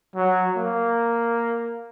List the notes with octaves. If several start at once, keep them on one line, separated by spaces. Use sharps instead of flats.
F#3
A#3